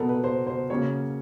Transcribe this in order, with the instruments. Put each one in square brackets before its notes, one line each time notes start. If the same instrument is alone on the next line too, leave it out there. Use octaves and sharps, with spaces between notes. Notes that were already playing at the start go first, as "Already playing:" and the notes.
Already playing: [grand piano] B2 F#3 B3 A4 A#4
B4
C5
C5
C#3 F#3 A#3 C#4 C#5